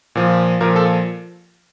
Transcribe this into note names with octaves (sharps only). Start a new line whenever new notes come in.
A#2 F3
A#2 F3 A#4
A4